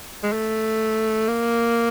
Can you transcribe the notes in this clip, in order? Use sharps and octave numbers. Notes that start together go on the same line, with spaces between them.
G#3
A3
A#3